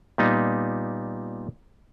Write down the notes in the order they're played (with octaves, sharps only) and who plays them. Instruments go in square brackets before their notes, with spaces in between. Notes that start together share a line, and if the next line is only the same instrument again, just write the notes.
[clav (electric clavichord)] A#2 G3 B3 D#4